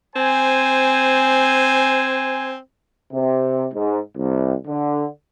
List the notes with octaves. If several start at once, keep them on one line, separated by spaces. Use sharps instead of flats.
C4 C5 G#5
C3
G#2
C2
D3